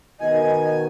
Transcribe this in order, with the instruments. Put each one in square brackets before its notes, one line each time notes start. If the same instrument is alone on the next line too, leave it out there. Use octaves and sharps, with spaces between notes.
[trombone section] B2 D#3 [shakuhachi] D#5 [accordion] G#5